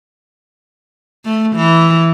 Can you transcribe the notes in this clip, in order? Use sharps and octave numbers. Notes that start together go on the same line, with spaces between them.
A3
E3